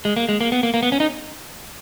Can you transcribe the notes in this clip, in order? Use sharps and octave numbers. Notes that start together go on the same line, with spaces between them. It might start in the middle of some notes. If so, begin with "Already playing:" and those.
G#3
A#3
G#3
A#3
B3
A#3
A#3
B3
C#4
D#4